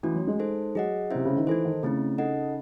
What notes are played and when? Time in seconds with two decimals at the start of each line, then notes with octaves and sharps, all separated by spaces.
0.03 E3 A3 C#4 F#4
0.16 F#3
0.27 G#3
0.40 D#4 A4 C5
0.75 F#3 G#4 D#5 F#5
1.11 C3 C#4 E4 C5 E5
1.25 C#3
1.36 D#3
1.47 E3 D#4 A4 C5
1.65 D#3
1.83 C#3 A3 C4 E4
2.18 D#4 A4 D#5 F#5